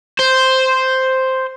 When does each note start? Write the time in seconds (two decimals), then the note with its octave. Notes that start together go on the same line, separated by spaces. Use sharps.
0.19 C5